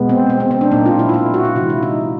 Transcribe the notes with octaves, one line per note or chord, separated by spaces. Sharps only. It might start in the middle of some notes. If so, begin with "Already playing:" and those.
Already playing: B2 G#3 B3
C4
C4
C4
C4
D4
A#2 F#3 A#3 D#4
F4
E4
F4
E4
F#4
F4
C3 E3 G#3 E4
E4
D#4